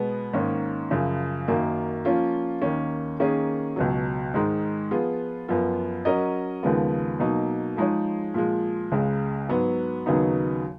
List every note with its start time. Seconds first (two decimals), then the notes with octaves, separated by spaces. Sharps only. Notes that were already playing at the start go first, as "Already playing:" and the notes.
Already playing: B2 G#3 B3
0.33 G#2 D#3 A#3 C#4
0.90 F#2 C#3 F3
1.48 F#2 D#3 F#3 A#3
2.05 F3 A#3 C#4 F4
2.62 D#2 D#3 A#3 C#4
3.20 D#3 A#3 C#4 G#4
3.76 C#2 B2 F#3
4.34 G#2 D#3 G#3 D#4
4.91 F3 B3 F4 G#4
5.48 F#2 F3 B3 F4
6.05 F#3 C#4 F#4 A#4 D#5
6.63 D#2 C#3 F3 G#3 B3
7.20 B2 F#3 A#3 D#4
7.77 F3 G#3 D#4 G#4 C#5
8.34 A#2 F3 G#3
8.92 C#2 C#3 G#3
9.49 G#2 F#3 B3
10.06 D#2 C#3 F#3 B3 D#4